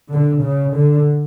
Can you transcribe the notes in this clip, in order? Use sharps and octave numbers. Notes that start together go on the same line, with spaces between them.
D3
C#3
D3